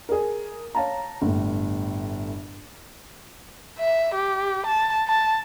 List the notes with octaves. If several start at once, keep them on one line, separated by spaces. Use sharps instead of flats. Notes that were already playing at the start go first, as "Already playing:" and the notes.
G#4 A#4
C#5 F5 A5 A#5
G1 A2
E5
G4
A5
A5